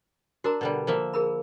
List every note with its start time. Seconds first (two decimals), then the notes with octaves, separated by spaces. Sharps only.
0.44 D4 F#4 A#4 A#5
0.61 B2 D3 G3
0.87 F3 A#3 E5
1.14 G#4 A#4 B5